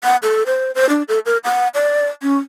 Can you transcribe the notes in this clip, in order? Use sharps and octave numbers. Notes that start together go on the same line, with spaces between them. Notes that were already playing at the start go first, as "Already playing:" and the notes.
F#5
A4
C5
C5
D4
A4
A#4
F#5
D5
C#4